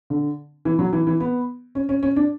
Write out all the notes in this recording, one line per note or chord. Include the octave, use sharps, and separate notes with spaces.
D3
E3
F#3
E3
E3
B3
C#4
C#4
C#4
D4